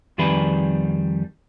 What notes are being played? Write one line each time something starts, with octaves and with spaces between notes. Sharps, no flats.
F2 D#3 G3 G#4 B4